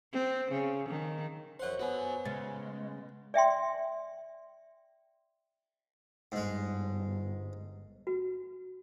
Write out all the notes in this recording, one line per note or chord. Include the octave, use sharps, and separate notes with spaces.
C4
C#3
D#3
F#2 C5 C#5 F#5 C6
B3 F#4 G#5
C#3 G#3 A6
D5 E5 G5 C6
G1 G#2 G#3
F#4